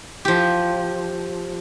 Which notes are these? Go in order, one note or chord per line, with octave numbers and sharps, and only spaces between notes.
F3 G4